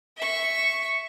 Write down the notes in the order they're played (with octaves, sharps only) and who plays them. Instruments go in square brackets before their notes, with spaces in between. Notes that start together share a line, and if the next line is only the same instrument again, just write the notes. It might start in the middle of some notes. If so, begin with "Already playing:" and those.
[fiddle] E5 C#6